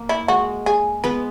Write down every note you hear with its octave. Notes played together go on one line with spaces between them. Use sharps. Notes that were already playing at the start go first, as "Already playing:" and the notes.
Already playing: A#3
E4
G#3 F#4
G#4
G#3 B3 B4